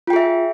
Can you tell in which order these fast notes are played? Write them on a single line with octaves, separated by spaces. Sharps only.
F4 G5 G#4 E5